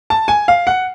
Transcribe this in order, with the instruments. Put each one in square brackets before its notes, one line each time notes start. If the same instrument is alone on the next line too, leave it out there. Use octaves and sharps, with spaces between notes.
[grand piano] A5
G#5
F5
F#5